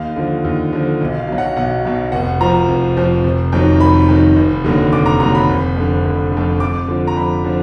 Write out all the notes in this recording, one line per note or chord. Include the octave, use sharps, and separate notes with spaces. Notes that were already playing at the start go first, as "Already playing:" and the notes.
Already playing: D#2 F5
D3 F3
D#2
D3 F3
B1
F5
B2 F#3
F#5
B1 F#5
B2 F#3
F1 F#5
F2 F3 A#5
F1
F2 F3
F1
F2 D#3 F#3
F1 B5
F2 D#3 F#3
F1
D#2 D3 F#3
F1 D6
A#5
D#2 D3 F#3 A#5
B5
F1
F2 D3
F1
F2 D3
F2 D6
D3 F3
A#5
F2 B5
D3 F3